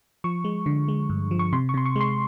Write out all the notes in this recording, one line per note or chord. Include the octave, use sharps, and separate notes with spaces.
F3 C#6
G#3
D3
G#3
G2
F3
C#6
C3 C6
C#6
C3 C6
C#6
G#3 C6